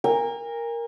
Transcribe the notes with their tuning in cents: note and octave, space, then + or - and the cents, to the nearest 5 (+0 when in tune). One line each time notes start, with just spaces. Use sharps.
A#4 +0 G#5 -40